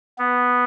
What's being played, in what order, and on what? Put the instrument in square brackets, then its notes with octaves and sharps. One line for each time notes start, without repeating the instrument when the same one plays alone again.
[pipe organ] B3